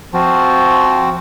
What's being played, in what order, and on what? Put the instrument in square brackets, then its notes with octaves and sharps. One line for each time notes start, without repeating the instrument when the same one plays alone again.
[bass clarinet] F3 [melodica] C4 F#4